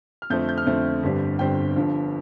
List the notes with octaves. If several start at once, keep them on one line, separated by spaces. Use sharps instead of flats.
F6
F2 D3 A3 C4 G6
G6
F6
F2 D3 A3 C4
G1 G2 D3 G3 C4
G1 G2 D3 G3 C4 G5
G1 G2 D3 F3